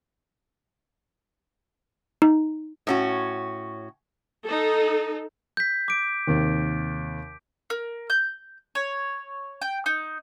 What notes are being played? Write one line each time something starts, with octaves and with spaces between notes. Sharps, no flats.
D#4
A2 C#4 F#4
D#4 A4
G6 B6
D6 D7
D#2 C3 D#3
A#4
G6
C#5
G5
D#4